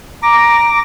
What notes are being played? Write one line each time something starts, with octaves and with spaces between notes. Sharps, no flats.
A#5 D6 A#6